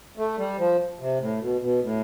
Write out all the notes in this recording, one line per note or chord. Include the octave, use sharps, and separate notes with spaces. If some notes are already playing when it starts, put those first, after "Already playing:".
A3
G3
F3
C3
A2
B2
B2
A2